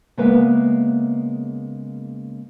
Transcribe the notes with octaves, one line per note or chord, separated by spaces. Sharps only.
C#3 G#3 A#3 B3 B4 E5